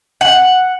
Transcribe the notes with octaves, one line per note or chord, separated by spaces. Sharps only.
F#5